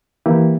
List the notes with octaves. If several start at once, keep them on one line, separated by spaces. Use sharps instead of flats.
E3 A#3 E4 G4